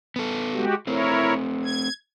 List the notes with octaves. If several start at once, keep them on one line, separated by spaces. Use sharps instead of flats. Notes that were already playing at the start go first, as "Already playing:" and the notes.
B3 A4
G#3 F#4 G4
A3 C4 E4 A#4 C#5
G#6